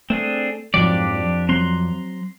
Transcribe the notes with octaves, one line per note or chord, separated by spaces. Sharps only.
A3 C4 D4 G#4
F2 G#2 B2 F3 F#3 D4 G4 D5
F#3 C4 A#5 C6 F#6